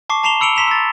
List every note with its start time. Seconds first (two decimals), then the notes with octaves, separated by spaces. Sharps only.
0.10 A5 C#6 D6 C7
0.23 A5 A#5 C7 E7 F7 G7
0.40 B5 E6 C#7 D7 F7 G7
0.56 A#5 C6 B6 E7 F7
0.67 E6 A6